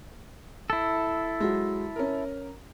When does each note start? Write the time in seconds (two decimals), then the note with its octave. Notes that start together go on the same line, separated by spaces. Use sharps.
0.70 E4 A4
1.40 F#3 G#3
1.96 C#4 A#4